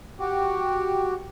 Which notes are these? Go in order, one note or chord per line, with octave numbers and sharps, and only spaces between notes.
F#4 G4